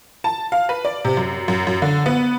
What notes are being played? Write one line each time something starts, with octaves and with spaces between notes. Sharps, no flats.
A5
F5
B4
D5
C3
F#2
F#2
F#2
D3
B3